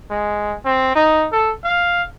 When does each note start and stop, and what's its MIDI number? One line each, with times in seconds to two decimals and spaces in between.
0.10 0.55 56
0.65 0.93 60
0.95 1.27 63
1.32 1.52 69
1.64 2.03 77